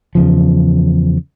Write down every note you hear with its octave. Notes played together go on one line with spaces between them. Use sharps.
E2 C#3 F3